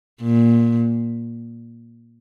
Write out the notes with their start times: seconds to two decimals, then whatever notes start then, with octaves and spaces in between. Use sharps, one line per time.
0.22 A#2